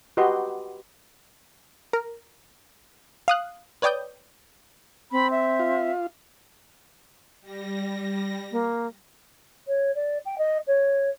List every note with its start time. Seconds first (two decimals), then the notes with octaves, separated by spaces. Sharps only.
0.17 F#4 G4 B4 D#5 C6
1.93 A#4
3.28 F5 D#6 F#6
3.82 B4 C#5 D5 G5 D#6 G6
5.12 C4 B5
5.31 E5
5.59 F4
7.42 G3 A#6
8.52 A#3
9.67 C#5
9.95 D5
10.25 G5
10.38 D#5
10.67 C#5